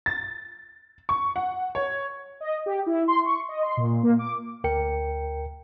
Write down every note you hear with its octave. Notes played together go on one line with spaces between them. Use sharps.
A6
C#6
F#5
C#5
D#5
G4
E4
C6
C#6
D#5
C6
A#2
A#3
D6
D2 A#4 G5 C#7